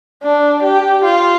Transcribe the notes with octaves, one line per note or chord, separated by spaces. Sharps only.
D4
G4
F4